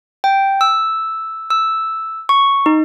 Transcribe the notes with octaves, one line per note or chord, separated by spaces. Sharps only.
G5
E6
E6
C#6
D#4